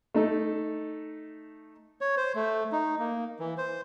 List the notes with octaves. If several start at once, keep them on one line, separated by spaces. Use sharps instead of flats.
A3 D#4 A4
C#5
C5
A3
D#4
A#3
E3
C5